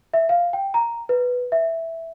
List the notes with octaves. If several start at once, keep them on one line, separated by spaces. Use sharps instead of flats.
E5
F5
G5
A#5
B4
E5